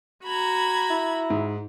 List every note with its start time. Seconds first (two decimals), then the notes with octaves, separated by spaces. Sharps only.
0.25 F#4 A#5 B5 G#6
0.90 E4
1.30 G#2